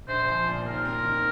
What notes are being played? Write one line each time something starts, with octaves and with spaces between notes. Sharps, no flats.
A#1 C5
F3
A#2
D#2 A#4
C4
D#3